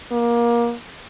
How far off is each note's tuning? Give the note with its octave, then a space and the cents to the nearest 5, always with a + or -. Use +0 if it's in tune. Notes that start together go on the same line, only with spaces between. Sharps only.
A#3 +25